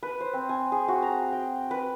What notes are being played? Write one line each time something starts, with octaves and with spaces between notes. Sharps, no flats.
B4
C5
C4
G#5
G#4
F#4
A#5
G5
B4